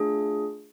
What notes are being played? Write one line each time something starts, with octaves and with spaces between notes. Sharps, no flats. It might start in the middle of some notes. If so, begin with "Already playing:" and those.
Already playing: A3 D4 F4 G#4